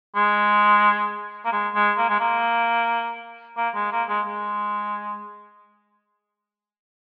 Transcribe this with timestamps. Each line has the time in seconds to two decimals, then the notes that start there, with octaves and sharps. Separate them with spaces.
0.16 G#3
1.45 A#3
1.52 G#3
1.75 G#3
1.98 A#3
2.09 G#3
2.20 A#3
3.57 A#3
3.75 G#3
3.92 A#3
4.09 G#3
4.26 G#3